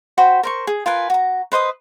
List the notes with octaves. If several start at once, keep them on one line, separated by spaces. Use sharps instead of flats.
F#4 C5 G5 B5
A#4 C5 C#6
G#4
F4 A#4 B4 G#5
F#4 A#5
B4 C5 D#5 D#6